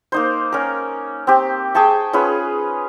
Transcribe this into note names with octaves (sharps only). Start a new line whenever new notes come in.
A#3 D#4 C5
C#4 A#4
C4 G4
G#4 G5 A5 C#6
C#4 F4 G#4 B4